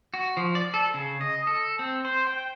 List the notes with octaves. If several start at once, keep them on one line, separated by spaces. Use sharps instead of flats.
F#4
F3
D5
A4
C#3
D#5
A4
C4
C5
G5